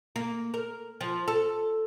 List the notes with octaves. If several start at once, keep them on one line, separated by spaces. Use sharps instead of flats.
A#3
A#4
F3
A4